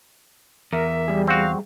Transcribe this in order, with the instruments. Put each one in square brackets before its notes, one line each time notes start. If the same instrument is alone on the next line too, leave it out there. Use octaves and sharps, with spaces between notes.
[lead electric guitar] E2 [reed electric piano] A#4 [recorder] E5
[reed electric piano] G3 G#4
[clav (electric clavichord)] C4 F#4 [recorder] F5